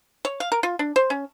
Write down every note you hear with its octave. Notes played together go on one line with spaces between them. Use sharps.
C#5
F5
A#4
F4
D4
C5
C#4